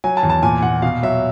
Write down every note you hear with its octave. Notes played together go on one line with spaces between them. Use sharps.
F#3 G#5
A5
E2
A5
A#2 G#5
A#2 F#5
B2 F5
F#3 E5